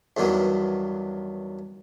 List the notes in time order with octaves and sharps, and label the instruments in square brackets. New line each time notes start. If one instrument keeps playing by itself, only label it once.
[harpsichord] E2 G2 D#3 F#3 B3